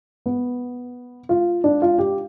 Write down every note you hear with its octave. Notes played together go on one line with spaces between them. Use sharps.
B3
F4
D4
F4
G4